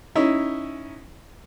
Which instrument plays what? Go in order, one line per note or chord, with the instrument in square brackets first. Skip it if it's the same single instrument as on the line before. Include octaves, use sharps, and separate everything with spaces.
[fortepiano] C#4 D#4 E4